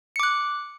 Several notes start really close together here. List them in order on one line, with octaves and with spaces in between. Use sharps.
C#7 D6 F#6